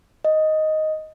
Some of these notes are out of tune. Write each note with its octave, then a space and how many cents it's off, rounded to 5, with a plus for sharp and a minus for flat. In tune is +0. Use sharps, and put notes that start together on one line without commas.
D#5 +5